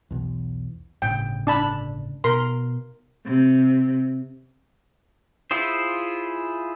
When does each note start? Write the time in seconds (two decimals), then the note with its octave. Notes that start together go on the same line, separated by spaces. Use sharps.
0.11 B1 E2
1.02 G1 A2 C#3 G5
1.47 D4 A5 B5
2.24 B2 A#4 C6
3.25 C3
5.51 E4 F4 G#4 C5